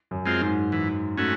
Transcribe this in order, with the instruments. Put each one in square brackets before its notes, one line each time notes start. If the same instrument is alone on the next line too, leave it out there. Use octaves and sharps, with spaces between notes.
[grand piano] F#2
[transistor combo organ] G#3 C4 F4
[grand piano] G#2
[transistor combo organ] E3
A3 C#4 F#4